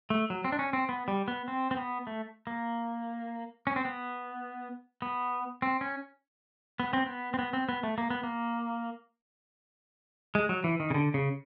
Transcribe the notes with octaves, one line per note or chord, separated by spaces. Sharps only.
A3
F#3
C4
D4
C#4
C4
B3
G3
B3
C4
C4
B3
A3
A#3
C#4
C4
B3
B3
C4
C#4
B3
C4
B3
C4
B3
C4
B3
A3
A#3
B3
A#3
G#3
F#3
E3
D#3
C#3
D3
C#3